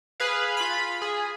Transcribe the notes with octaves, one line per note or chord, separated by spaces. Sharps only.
G#4 B4 F5
F4 B5
G#4